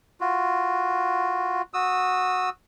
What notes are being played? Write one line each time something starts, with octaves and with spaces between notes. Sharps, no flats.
F4 F#4
F#4 D#6 E6